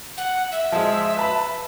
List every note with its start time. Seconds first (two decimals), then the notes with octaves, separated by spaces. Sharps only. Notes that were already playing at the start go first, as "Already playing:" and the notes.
0.17 F#5
0.52 E5
0.72 F3 G#3
1.17 B4 A5 B5